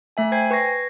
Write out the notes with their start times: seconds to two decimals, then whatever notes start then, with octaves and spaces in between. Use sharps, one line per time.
0.17 A3 E5 G#5
0.32 C5 G5 G#5 G#6 C7
0.51 B4 C#6 G#6 A#6 C7